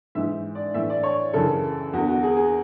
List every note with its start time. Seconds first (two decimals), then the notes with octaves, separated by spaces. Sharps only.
0.15 G#2 E3 E5
0.55 D5
0.74 A2 E3 E5
0.90 D5
1.03 C#5
1.33 F#2 C#3 E3 A4
1.93 E2 F#4
1.96 D3
2.08 F#4
2.23 G#4
2.37 G#4